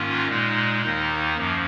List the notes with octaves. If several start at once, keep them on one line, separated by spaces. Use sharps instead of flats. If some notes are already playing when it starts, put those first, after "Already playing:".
Already playing: G#2 D#3 A#3 C#4 F4
A#2 G#3 D#4
D#2 D#3 A#3 D#4
F#2 F3 A#3